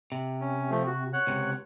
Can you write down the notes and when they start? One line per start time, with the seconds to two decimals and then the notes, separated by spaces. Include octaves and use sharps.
0.12 C3
0.41 C#4
0.70 F3 A3
0.86 F#4
1.13 C#5 F#5 F#6
1.27 C#2 C3